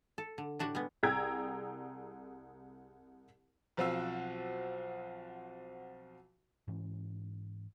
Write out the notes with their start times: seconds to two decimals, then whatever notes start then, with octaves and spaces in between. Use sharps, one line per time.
0.18 A4
0.38 D3
0.59 A2 D4 F#4 G4
0.75 G3 G#3 B3
1.03 C2 G#4 G5 A#5 E6 G#6
3.77 B1 F3 C4 F4 F#4 E6
6.68 G#2 E3 C#4